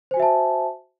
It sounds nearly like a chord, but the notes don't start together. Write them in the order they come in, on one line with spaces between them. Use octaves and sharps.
C5 G#5 F#4 E5 A5